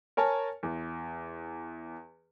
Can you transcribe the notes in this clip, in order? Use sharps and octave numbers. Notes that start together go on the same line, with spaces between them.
A#4 C#5 G#5 A5
E2